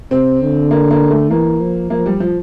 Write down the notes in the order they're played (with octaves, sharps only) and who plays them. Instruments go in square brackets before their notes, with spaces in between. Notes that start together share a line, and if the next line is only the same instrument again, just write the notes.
[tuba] C3 [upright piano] C4
[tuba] D3
[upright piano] A#3
A#3
A3
[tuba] E3 [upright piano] A#3
[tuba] F3
[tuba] F3 [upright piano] A#3
[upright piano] G3
F3